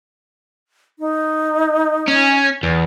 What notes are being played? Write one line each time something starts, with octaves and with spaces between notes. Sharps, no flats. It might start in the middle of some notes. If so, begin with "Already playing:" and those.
D#4
C#4
E2